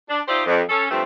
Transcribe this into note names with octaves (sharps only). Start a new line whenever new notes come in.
D4
D#4 F4 G4 C5 D5 E5
F2
C#4 A4
G2 F3 A3 C4